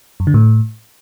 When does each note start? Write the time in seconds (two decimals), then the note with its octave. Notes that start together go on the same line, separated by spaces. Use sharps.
0.20 F#2
0.27 D3
0.34 A2